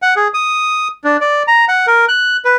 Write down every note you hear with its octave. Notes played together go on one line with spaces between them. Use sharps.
F#5
G#4
D#6
D4
D5
A#5
F#5
A#4
F#6
B4